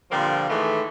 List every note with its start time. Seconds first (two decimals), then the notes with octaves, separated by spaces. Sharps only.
0.11 A#2 D3 F3 G3 A#3 C4
0.50 A2 D#3 E3 G#3 A3